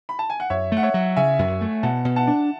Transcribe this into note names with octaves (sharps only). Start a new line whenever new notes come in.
B5
A5
G#5
F#5
F#2 C#5 E5
A3
F#5
C#5 E5
F#3
C#3 E5 G#5
F#2
A3
B2 F#5 A5
B2
F#5 A5
D4